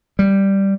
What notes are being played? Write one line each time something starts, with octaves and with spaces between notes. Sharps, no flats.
G3